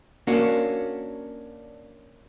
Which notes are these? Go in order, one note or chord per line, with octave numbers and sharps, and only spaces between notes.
A#3 C#4 D4 F#4